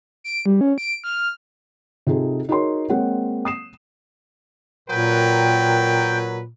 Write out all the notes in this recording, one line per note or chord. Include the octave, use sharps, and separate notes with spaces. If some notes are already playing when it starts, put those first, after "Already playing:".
D7
G3
C#4
D7
F6
C3 D#4 F4 G#4 A4
D#4 F#4 G#4 A#4 C#5 C6
G#3 A#3 C4 C#5 F#5
D#6 C7 E7
A#2 F#3 A#4 B4 G5